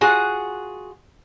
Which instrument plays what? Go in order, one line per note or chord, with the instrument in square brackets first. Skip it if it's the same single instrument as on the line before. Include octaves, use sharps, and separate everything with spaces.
[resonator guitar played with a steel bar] F4 F#4 G#4 F#5